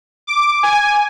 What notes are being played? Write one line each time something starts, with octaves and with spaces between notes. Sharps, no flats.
D6
G#5